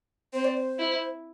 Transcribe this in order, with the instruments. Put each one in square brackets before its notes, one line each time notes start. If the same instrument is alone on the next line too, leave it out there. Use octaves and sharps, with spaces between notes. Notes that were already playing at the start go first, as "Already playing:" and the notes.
[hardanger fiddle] C4 [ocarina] C5
[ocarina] D5
C5
[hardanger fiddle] E4